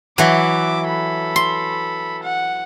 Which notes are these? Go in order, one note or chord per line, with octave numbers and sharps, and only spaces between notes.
E3 F#3 E5 D6
A4 B5
C6
F#5